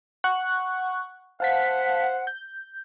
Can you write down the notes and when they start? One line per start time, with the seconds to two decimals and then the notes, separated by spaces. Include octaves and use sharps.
0.24 F#5 C#6 F#6
1.40 C5 F5 F#5 A5 B6
2.27 G6